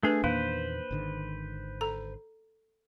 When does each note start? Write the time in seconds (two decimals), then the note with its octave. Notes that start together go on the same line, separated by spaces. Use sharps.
0.03 A3 D4 G#4 B4 G#5
0.24 E2 A#2 D#3 A#3 B4 C5
0.91 G#1 D3 D#3
1.81 A4 A#5